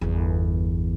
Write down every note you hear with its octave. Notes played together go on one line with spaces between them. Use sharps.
G1 E2